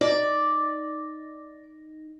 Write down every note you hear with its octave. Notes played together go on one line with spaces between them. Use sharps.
D#4 D5